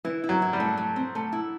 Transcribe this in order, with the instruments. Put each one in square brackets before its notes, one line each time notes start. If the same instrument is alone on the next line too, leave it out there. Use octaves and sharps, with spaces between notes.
[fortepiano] E3 [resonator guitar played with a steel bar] E4
[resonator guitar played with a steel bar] E4
[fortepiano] F#3
[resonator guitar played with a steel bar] E4
[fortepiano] G3
[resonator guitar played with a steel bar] A3
A3
C4
A3
E4